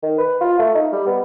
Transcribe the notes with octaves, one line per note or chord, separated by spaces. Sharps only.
D#3
B4
F4
A3
D#4
G3
B3